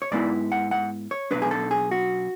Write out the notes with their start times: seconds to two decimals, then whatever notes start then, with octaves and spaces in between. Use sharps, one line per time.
0.02 C#5
0.11 G#2 G#3 B3 E4 D5
0.52 F#5
0.71 F#5
1.11 C#5
1.31 B1 B2 G#3 D4 B4
1.42 G#4
1.51 A4
1.71 G#4
1.91 F#4